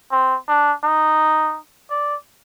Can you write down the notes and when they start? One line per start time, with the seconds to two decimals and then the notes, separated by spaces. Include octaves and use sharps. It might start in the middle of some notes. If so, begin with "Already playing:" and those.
0.12 C4
0.48 D4
0.84 D#4
1.91 D5